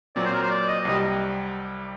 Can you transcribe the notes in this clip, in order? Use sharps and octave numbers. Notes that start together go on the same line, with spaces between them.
A#2 F#3 C4 D5
C5
A#4
C5
D5
D#5
C2 C3 G3 D#5